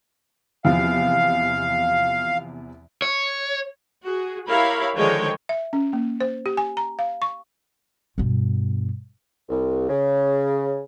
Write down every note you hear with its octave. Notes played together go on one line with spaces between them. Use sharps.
E2 C3 F3 F5
C#5
F#4 G#4
E4 G4 A#4 C#5 F5 B5
D3 D#3 F3 G#3 C#5 G5
E5
C#4
A#3
C5
G4
G#5
A#5
F5
C#6
G2 B2
C2
C#3